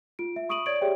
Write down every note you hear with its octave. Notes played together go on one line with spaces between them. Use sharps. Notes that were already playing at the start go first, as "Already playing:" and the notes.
F4 D7
E5
B5 C#6 D#6 D7 D#7 F#7
C#5 D5 G#6 A6 D7 F#7
G4 G#4 C#5 D5 E5 G5